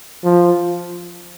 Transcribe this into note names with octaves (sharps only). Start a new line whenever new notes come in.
F3